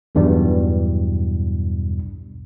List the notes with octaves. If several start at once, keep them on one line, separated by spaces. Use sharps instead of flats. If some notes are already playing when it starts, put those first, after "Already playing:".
B1 E2 G2 B2 G3